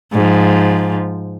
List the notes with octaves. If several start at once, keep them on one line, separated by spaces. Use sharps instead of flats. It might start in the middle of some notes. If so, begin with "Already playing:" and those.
G#2 F3